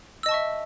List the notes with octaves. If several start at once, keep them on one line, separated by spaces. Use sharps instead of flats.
D#5 E5 A5 C#6 E6